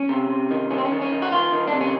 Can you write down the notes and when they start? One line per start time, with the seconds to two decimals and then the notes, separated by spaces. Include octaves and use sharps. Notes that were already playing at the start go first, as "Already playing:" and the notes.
Already playing: C#4
0.09 C3
0.30 C3
0.51 D#3
0.71 D#3 C#4
0.78 C4
0.85 C#4
0.92 D#3
1.01 C#4
1.12 D#3
1.22 F#4
1.32 D#3 F4
1.52 D#3
1.68 D4
1.73 C3
1.81 C#4